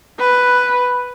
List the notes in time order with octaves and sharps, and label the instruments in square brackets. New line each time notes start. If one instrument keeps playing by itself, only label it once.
[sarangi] B4